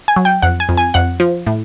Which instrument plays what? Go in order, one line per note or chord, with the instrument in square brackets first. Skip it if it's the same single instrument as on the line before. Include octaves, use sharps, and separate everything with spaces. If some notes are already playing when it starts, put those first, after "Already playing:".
[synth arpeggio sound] G#5
F#3
G5
F2 F#5
G#5
F2
G#5
F2 F#5
F3
A2